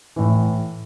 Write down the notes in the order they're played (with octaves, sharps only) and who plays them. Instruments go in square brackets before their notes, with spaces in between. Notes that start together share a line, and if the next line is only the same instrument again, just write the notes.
[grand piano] A2 E3